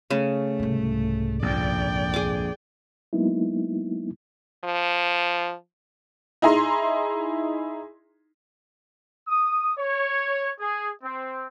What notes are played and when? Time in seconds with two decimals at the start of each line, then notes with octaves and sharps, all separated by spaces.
0.10 C#3 A3
0.59 C2 G#2
1.42 A#1 F2 D5 G5
2.14 G#4 D6
3.13 F#3 G#3 A#3 B3 D#4 E4
4.64 F3
6.42 D#4 E4 G#4 A#5 C6
9.28 D#6
9.77 C#5
10.59 G#4
11.03 C4